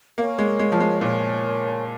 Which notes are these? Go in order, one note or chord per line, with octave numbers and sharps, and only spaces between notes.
A#3 A#4 C#5 G#5 C#6
G#3
G#3
F3
G#3
A#2 A#4 C#5 G#5 C#6